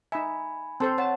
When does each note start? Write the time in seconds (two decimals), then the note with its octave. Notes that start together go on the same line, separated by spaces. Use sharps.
0.12 D#4 E5 G#5 B5
0.80 C4 A4 C5 A5 C6 A6
0.98 C#5 F#5 A5